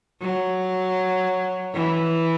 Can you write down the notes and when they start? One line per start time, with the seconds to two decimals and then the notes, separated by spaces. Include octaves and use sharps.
0.21 F#3
1.74 E3